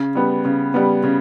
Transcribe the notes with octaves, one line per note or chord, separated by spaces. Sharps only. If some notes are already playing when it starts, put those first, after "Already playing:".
Already playing: C#3
G3 B3
C#3
G3 B3
C#3